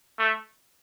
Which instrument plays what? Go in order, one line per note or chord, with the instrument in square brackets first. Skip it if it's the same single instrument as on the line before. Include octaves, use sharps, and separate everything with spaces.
[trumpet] A3